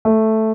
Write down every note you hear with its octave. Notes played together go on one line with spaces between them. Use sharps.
A3